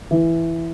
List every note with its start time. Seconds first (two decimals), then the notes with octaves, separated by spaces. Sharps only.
0.11 E3